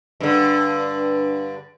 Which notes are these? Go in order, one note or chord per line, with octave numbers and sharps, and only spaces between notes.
G2 D3